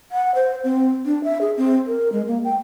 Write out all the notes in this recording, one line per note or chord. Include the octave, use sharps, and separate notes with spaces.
F#5
C5
C4
D4
E5
G#4
C4
A#4
G#3
A#3
G5